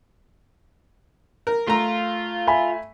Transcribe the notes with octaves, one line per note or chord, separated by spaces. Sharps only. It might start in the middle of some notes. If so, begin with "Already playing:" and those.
A#4
A3 F4 A#5
E5 G#5 B5